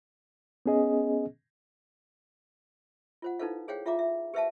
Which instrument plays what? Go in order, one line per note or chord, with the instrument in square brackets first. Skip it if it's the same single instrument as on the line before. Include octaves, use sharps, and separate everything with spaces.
[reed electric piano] B3 C#4 G#4 D#5
[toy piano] F4 C5 F#5
D#4 E4 A4 B4 C5 F5
G#4 C5 C#5 F5 G5
F4 E5 F5 A#5 D6
E5
G4 B4 C5 E5 F5 A5